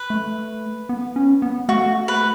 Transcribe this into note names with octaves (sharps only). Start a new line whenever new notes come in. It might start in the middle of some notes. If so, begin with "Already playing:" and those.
Already playing: B4
A3
B3
C#4
B3
A3 F#4
B4